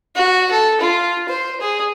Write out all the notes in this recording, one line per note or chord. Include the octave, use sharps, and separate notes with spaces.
F#4
A4
F4
C5
G#4